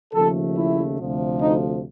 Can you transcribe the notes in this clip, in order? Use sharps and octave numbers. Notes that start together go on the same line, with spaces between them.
D#2 C#3 F3 A3 A4
E4
D2 C3 F3
D#4